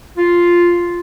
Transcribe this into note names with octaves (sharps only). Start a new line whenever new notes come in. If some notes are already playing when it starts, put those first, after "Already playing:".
F4